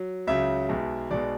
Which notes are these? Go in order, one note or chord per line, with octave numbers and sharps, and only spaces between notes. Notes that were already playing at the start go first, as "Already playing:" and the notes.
Already playing: F#3
C#2 C#3 F#3 E5
B1 B2 G#3
B1 B2 G#3 D5